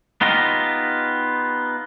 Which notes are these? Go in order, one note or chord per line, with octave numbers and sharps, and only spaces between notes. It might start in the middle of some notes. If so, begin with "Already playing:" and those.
B3 D#4 F4 G4 D#5